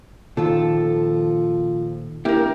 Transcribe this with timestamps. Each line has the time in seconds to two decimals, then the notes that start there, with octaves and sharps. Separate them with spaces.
0.37 A#2 D#3 F3 F4 A4
2.25 E1 A#3 E4 G4 A#4